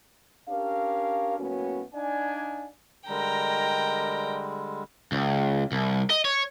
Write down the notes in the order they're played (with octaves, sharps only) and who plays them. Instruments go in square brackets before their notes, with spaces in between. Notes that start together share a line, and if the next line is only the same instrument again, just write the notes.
[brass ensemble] C#4 D4 G4 A#4 F5
A2 F#3 A#3 B3 C#4 F#4
D4 D#4 D5 F5 G#5
[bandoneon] D3 G3 G#3 [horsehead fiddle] A#4 D#5 [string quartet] G5 A#5
[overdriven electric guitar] C#2
C2
D#5
C#5